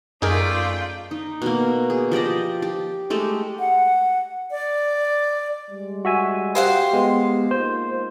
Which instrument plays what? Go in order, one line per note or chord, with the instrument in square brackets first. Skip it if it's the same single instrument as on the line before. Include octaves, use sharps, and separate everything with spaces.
[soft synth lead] F#2 [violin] A3 D5 [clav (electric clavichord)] D#4 G#4 A#4 [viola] F4 G5
[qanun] D#4
B2 A#3
G#4
F3 G4 D5 D#5
G4
G#3 A3 G4
[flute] F#5
D5
[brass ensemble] G3 G#3
[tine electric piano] F#4 E5 G#5
[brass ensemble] G4 [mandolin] C5 F5 F#5
[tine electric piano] G#3 B3
[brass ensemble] A#3 D#4 F4 [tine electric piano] C5